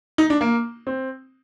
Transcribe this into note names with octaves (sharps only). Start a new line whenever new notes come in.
D#4
D4
A#3
C4